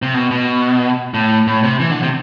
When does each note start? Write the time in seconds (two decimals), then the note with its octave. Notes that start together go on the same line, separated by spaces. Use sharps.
0.02 C3
0.14 B2
0.31 B2
1.14 A2
1.47 A2
1.63 C3
1.80 E3
1.91 D3
2.03 C3